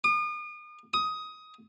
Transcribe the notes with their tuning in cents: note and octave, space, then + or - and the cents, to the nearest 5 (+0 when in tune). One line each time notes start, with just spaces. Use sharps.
D#6 -40
D#6 +15